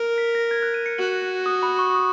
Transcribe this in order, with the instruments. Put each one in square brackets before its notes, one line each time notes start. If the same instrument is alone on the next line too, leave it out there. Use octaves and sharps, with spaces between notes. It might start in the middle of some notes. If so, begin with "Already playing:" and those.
Already playing: [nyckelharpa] A#4
[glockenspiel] B6
A#6
G#6
F#6
D#7
C#7
[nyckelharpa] F#4
[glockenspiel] D#6
B5
C#6
D#6